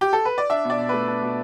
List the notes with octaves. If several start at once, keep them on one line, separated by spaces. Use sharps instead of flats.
G4
A4
B4
D5
D4 E5
B2
D5
B2
A3 B4
D4
B2